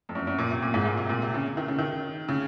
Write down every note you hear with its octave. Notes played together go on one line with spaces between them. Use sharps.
F2
F#2
F#2
A#2
C3
A#2
G#2
A#2
C3
A#2
C3
C#3
D#3
C#3
D#3
C#3